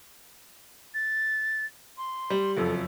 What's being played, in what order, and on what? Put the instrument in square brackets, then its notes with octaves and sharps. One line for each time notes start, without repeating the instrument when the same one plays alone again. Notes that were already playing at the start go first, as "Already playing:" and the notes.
[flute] A6
C6
[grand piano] G3
[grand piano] F#1 F2 [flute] A4